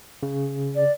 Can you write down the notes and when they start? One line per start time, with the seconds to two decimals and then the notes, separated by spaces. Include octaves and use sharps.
0.23 C#3
0.76 D5